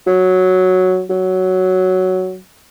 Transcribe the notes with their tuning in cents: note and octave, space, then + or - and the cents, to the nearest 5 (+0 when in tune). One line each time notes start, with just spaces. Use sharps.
F#3 +0
F#3 +5